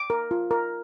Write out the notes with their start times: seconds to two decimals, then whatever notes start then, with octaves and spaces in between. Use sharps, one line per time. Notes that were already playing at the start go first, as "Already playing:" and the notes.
Already playing: D6
0.10 A#4
0.31 F4
0.51 A#4